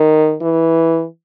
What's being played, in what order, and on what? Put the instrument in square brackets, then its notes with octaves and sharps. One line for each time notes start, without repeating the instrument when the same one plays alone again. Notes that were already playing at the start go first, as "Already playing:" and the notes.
Already playing: [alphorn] D#3
E3